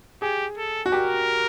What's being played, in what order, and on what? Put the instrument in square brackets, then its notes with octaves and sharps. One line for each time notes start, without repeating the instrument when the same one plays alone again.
[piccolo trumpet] G4 [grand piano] G#4
[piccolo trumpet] A4
[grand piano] F#4
[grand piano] G4 [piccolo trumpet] A#4